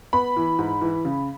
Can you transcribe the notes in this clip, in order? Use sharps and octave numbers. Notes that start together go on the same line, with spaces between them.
B3 B5
E3
G#2
E3
C#3